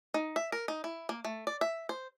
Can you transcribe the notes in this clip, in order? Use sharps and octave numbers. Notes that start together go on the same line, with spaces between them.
D#4
E5
A#4
D#4
E4
A#3
A3
D5
E5
C5